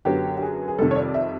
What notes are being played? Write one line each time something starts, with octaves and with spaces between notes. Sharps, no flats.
F#2 D3 F#3 B3 G4
G4
G#4
G#4
F2 C3 D#3 G3 A4
C#5
D5
E5